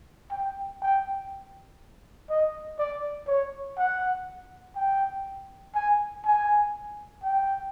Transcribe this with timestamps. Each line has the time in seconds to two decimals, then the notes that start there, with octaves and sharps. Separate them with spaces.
0.31 G5
0.82 G5
2.30 D#5
2.79 D5
3.27 C#5
3.78 F#5
4.76 G5
5.75 G#5
6.25 G#5
7.23 G5